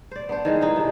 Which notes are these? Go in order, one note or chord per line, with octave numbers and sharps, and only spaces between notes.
C5 D5
B3 D4 C5
D#3 E3 G#3
E3 D#4
C3 D4